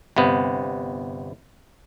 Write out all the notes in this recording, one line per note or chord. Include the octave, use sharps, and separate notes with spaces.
G1 C3 B3